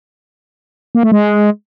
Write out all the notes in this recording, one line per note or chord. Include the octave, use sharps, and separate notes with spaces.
A#3
A3
G#3